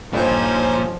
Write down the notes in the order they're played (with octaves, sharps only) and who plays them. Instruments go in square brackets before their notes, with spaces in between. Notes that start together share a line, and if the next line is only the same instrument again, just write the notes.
[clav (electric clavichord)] A1 G2 [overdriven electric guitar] A#2 [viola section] F3 [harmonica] C#4 D#4 C5